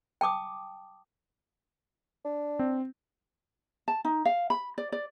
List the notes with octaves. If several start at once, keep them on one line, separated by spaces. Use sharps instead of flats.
G5 A5 D6 D#6
D4
C4
A5
D#4
F5
B5
D5
D5